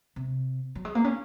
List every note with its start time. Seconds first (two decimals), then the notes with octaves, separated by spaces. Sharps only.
0.16 C3
0.75 F#3
0.85 G#3
0.95 A#3
1.04 C#4